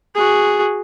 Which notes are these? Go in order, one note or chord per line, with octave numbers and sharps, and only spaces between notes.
F#4 G#4